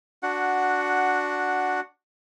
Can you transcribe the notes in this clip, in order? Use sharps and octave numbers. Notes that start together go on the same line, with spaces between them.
D4 F#4 F#5